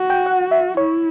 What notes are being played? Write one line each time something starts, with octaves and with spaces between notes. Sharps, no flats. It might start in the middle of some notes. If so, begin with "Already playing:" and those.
Already playing: F#4
G5
F#5
E5
E4 C#5